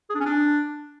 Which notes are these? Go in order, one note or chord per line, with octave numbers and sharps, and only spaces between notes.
G#4
D4
C#4
D4